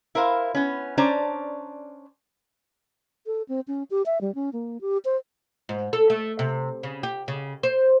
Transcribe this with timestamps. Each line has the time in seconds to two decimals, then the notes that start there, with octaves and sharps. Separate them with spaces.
0.15 E4 A#4 C5 F5
0.55 B3 C#4
0.98 C#4 D4 C5 D5 A5 A#5
3.26 A4
3.49 C4
3.68 C#4
3.91 G4
4.06 E5
4.21 G3
4.35 C#4
4.53 A#3
4.81 G4
5.05 C5
5.69 G#2
5.93 A4
6.10 A3
6.39 C3
6.83 C#3
7.03 G4
7.28 C#3
7.63 C5